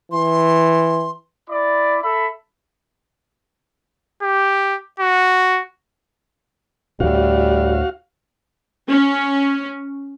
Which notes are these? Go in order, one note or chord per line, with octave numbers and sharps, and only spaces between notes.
E3 C6
E4 D5 B5 D6
A4 E5 B5
G4
F#4
D2 A2 G3 F#4 F5
C#4